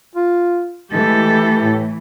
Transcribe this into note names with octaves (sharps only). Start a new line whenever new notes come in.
F4
E3 G#3 A3 G4 A4
A2